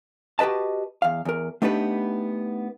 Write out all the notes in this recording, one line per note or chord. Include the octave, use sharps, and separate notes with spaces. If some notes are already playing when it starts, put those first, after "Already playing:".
F#4 G4 B4 D#5 A5
E2 F5
E2 A#4
A3 B3 D4 D#4 G4 B4